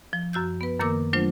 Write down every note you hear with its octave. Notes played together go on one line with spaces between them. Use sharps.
F3
F#2 F#4 E6 G6
B3 B4
F#2 D#3 A#3 A#4 D6 E6
F#3 A3 D4 F4 C5